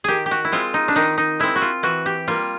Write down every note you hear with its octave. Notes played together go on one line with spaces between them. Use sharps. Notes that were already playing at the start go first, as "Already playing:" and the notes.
D#3 G4 G#4
G4
F#4
E4
G#3 C4 F4
D#4
D4
D#3 D#4
D#4
G#3 C4 E4
F#4
F4
E3 F#4
G4
G3 A#3 F4